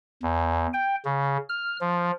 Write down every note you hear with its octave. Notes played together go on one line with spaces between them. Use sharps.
E2
G5
C#3
F6
F3